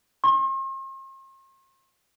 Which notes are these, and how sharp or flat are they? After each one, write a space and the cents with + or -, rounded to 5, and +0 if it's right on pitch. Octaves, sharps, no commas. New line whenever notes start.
C6 +45